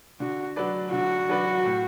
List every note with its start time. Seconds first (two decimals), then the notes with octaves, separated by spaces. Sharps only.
0.20 D3 F#4
0.56 F#3 D4 B4 D5
0.92 D3 F#4
1.29 F#3 D4 B4 D5
1.65 A2